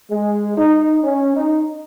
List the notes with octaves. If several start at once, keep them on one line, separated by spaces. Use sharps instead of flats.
G#3
D#4
C#4
D#4